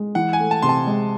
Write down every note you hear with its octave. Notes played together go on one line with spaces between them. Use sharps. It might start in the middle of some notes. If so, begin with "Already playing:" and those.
Already playing: G#3
E3 F#5
G#5
A3
A5
C3 C6
A5
G#3